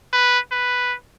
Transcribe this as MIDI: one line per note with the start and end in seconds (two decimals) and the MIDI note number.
0.13 0.39 71
0.52 0.94 71